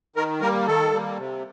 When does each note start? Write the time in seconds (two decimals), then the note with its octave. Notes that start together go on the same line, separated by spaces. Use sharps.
0.16 D#3 A#4
0.41 G3 A#3 A#4
0.67 D#3 A4
0.93 G3 A#3
1.18 C3